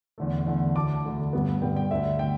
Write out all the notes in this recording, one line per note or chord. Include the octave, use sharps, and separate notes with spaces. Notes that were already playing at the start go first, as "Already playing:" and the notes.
E2 D3 A3
E2 D3 A3
D2 D3 A3 A5 D6
D2 D3 A3
G2 D3 G3 B3
G2 D3 G3 B3 G5
G5
D2 D3 A3 E5
D3 A3 G5